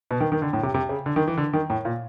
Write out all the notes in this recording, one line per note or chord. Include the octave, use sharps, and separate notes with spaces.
B2
D#3
D#3
D3
A2
C3
C3
C#3
D3
D#3
E3
D3
D#3
A2
A#2